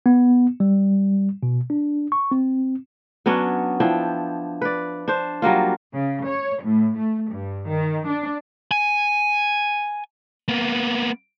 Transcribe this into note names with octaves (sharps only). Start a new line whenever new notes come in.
B3
G3
B2
D4
C#6
C4
F#3 B3 C#4 D4
F3 D4 E4 G5
B4 D5
D4 C5
F#3 G3 A#3 F4
C#3
C#5
A2
A3
G2
D#3
D4
G#5
A#3 B3